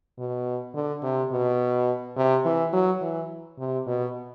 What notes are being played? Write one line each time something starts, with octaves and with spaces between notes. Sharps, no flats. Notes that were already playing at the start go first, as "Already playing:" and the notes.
B2
D3
C3
B2
C3
E3
F#3
E3
C3
B2